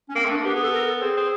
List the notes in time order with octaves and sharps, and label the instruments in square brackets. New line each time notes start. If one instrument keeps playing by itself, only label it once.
[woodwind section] C#4
[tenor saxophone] A#3 [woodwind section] C4
[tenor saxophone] A3 [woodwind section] D4
[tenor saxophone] A#3
[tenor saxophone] B3 [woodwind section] G4
[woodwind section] G#4
A4
A#4
A4
[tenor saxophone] C4 [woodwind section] G#4
[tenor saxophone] C4